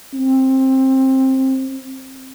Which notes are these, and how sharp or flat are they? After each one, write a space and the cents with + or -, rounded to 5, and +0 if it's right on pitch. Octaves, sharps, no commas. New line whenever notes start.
C4 +15